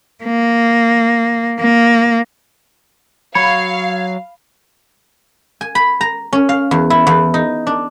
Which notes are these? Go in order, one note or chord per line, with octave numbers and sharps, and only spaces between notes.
A#3
A#3
F#3 C#5 F5 B5
G#5
B5
A#5
C#4
F5
E2
E4
E2
D#4
D4